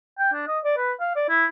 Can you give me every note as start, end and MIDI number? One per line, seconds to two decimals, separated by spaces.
0.19 0.30 79
0.33 0.47 62
0.48 0.59 75
0.64 0.76 74
0.77 0.92 71
1.00 1.11 77
1.16 1.25 74
1.29 1.45 64